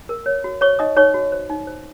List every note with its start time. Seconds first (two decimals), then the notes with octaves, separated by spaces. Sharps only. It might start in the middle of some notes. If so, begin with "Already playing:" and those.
0.09 A#4
0.26 C#5
0.44 F#4
0.61 C5 C#5 C#6
0.79 D#4 D#5 D#6
0.97 D#4 C#5 C#6
1.14 F#4
1.32 C5
1.50 D#4
1.67 C5